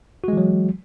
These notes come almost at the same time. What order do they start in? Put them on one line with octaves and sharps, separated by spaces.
F#4 G#3 E3 F#3